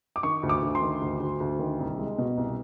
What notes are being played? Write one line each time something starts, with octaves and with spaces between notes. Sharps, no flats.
D6
D#3 C#6
D2
D6
D2
C6
D#3
D2
D2
D2
D#3
C2
G#3
B2
C2